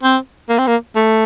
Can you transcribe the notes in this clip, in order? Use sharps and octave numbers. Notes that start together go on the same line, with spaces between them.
C4
A#3
C4
A#3
A3